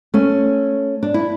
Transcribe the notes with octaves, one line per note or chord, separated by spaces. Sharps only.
A3 C#4
D4
E4